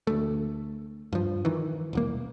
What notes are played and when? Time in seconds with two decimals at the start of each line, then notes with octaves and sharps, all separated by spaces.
0.07 D2 A3
1.13 G2 F3
1.45 D#3 E3
1.93 E1 C2 A#3